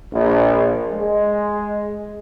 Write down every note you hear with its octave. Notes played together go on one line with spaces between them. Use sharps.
A#1
G#3